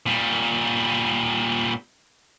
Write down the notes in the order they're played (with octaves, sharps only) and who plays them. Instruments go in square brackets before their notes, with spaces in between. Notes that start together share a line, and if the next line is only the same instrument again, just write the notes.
[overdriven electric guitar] A#2 G3